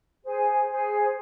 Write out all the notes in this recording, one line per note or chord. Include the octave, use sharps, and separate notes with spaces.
G#4 C5 G#5
G#4 C5 G#5